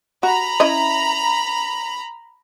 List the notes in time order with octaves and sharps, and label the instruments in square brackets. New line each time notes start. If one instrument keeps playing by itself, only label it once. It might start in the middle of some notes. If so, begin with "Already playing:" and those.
[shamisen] F#4 [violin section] A#5 B5
[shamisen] C#4 E4 D#5